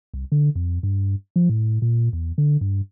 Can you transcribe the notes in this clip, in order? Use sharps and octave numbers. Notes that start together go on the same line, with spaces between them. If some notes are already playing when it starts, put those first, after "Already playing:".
C2
D3
F2
G2
F3
A2
A#2
E2
D3
G2